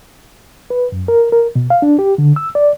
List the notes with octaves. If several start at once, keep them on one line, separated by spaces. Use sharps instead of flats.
B4
F#2
A#4
A#4
B2
F5
D4
G4
D3
E6
D5